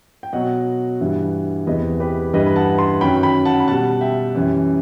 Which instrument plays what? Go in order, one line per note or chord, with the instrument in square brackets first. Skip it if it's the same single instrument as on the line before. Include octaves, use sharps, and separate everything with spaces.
[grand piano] G5
B2 F#3 D#5 F#5
G2 E3 G3
E2 C3 E3 B4 D#5
G4 B4
G2 E3 G3 B4 D#5
B5
F#5 A5
A5 C6
F#2 D#3 F#3 G5 B5
G5 B5
F#5 A5
B5
B2 G3 F#5 A5
E5 G5
F#2 E3 G3